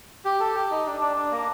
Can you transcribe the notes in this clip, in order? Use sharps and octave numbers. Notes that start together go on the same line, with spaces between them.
G4
A4
G4
D#4
D4
D4
D4
A#3